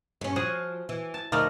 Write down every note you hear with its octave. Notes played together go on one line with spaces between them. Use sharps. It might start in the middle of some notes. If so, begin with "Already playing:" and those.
G2 C#4
F3 F#4 G#4
E3
A5
D2 F3 D#4 A#4 D5